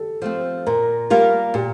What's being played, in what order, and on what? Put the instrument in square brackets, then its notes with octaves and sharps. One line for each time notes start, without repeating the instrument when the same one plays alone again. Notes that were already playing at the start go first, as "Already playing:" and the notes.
Already playing: [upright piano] G4 A4
[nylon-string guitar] F3 A3 C4
[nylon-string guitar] A#2 [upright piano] A#4
[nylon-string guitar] G3 A#3 F4 A#4
[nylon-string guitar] A#2 [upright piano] G4